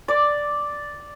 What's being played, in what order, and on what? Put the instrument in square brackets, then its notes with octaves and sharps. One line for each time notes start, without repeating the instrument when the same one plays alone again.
[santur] D5